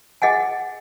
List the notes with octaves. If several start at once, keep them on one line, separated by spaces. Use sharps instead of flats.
G#4 D#5 F#5 G#5